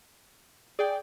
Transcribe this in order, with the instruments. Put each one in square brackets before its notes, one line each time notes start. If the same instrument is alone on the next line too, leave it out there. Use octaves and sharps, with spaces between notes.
[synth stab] G#4 G5 [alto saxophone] D5